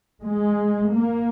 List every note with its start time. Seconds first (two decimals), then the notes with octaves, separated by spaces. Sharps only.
0.22 G#3
0.89 A#3